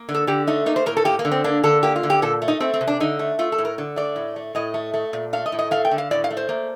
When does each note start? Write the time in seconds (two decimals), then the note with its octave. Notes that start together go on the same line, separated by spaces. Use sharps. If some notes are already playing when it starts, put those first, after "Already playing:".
Already playing: A#3
0.09 D3
0.14 A4
0.27 D3 G4
0.47 A3 D#4
0.66 A#3 D#4
0.76 C5
0.86 A2 A#4
0.97 A4
1.05 A#3 G4
1.19 A#3
1.25 D3
1.31 C4
1.44 A#3 D4
1.63 D3 A4
1.83 A#3 G4
1.96 F4
2.03 D3
2.10 G4
2.22 A#2 A4
2.42 A3
2.48 D#4
2.60 A3 C4
2.74 C4
2.81 C3
2.87 D4
3.00 D3 D#4
3.19 A3
3.39 A3 F4
3.52 A4
3.58 A2
3.65 A#4
3.78 D3
3.96 A3 D5
4.16 A2
4.36 A3
4.55 A2 D#5
4.74 A3
4.94 A3
5.13 A#2
5.33 A3 F5
5.46 D#5
5.52 A2
5.59 D#5
5.71 A3 F5
5.85 G5
5.91 D3
5.98 F5
6.11 A2 D5
6.24 F5
6.30 A3
6.37 C5
6.49 A#3